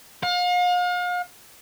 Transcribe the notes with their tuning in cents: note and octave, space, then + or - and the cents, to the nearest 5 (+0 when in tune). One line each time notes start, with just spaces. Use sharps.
F5 +40